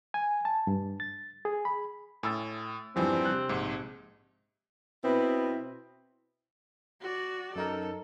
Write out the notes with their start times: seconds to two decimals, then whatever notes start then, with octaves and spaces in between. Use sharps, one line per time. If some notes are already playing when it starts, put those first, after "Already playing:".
0.14 G#5
0.45 A5
0.67 G2
1.00 A6
1.45 G#4
1.65 B5
2.23 A2 G#5 E6 A6
2.96 E2 G2 E3 F3 G3 C4
3.25 C3 F#6
3.49 A#1 G#2
5.04 B2 B3 C4 E4
7.01 F#4 D5
7.56 F#2 D#4 A4 A#4